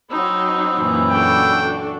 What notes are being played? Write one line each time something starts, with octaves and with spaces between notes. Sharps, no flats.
F#3 C4 D#4 B5 E6
F#2 A#2 E3
D4 F#4 A4 G5